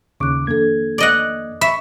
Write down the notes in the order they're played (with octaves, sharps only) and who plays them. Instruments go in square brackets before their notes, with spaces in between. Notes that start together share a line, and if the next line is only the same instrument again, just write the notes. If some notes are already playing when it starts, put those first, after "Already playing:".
[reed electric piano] D#2 C#3 D6 [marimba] C#6 F#6
[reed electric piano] F2 A#3 G#6 [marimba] D#3 D4 A4
[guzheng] D5 D#5 F#5
[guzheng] E5 [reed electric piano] B5 C#6